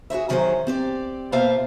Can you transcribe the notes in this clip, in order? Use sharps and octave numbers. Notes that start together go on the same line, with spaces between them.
F#4 G#4 C5 E5
F#2 D#3 F#3 F4 G#4 C5
C4 G4 D5
B2 A#3 F4 C5 E5 F5